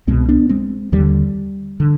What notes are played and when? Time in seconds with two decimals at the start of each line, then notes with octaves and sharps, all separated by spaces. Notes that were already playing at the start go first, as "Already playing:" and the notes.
0.07 C2 B2 G#3 C4
0.29 B3 D4
0.49 G#3 C4
0.92 D#2 D3 D#3 G3
1.80 D3